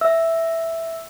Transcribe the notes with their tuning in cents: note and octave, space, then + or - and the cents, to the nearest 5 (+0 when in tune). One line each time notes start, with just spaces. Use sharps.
E5 +0 E6 +0